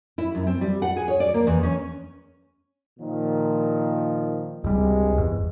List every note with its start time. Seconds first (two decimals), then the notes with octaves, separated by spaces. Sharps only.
0.18 E4
0.35 F#2
0.47 C4
0.61 G3
0.82 F#5
0.96 G#4
1.08 C#5
1.20 D5
1.34 A#3
1.47 E2
1.63 C#4
2.99 A#2 D#3 F3
4.64 C#2 G2 C3 G3 G#3
5.16 G1 E2